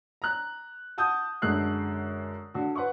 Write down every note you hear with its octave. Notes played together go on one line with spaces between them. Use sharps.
A#5 F#6
F#5 A5 D#6 G6
F#2 D3 G#3 F#6 C7
D3 F#4
B4 F#5 C6 C#6